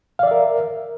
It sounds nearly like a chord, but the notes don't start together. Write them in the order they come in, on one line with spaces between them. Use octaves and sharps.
F5 D5 E5 A#4